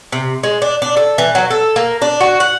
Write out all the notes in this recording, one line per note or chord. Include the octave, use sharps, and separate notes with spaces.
C3
G#3
D4
D4
A4
E3
F#3
A4
A#3
D4
F#4
F#5